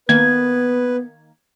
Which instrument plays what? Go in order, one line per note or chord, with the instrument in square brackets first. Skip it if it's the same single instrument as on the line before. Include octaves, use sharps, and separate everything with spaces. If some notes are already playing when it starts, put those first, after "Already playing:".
[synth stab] D#3 A#3 [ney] B3 [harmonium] B4 [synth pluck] G#6